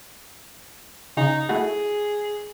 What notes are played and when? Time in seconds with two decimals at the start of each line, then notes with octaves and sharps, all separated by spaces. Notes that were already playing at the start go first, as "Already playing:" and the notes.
1.17 C#3 D#4
1.49 A3 E4 F#4 G#4